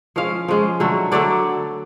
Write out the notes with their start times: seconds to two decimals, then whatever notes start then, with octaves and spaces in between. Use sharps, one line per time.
0.16 F3 G#3 C#4 F5
0.48 F3 G#3 C#4
0.80 D3 F#3 A3
1.12 D3 F#3 A3 D5